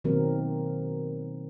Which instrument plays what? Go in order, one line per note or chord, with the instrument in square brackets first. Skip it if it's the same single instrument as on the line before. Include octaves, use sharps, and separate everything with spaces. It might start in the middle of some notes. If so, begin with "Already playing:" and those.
[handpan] B2 D#3 F#3 A#3 C4 A#4